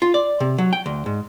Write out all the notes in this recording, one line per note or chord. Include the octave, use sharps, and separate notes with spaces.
F4
D5
C3
F#3
G5
D2
G#2